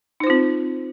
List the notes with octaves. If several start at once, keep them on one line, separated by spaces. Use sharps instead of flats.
C4 D#4 F4 C5